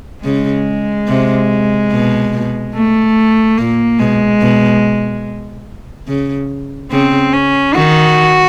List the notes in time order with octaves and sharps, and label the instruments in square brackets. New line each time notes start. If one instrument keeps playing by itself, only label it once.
[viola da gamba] C#3 [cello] G#3
[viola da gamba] C3
B2
[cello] A3
[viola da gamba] A#2 [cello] A#3
[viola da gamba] B2 [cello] G#3
[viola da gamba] B2
C#3
[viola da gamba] C#3 [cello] C4
[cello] C#4
[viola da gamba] D#3 [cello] F#4